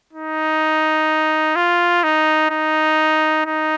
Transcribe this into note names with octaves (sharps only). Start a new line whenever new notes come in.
D#4
F4
D#4
D#4
D#4